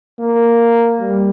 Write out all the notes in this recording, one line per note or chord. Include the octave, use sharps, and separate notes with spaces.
A#3
G3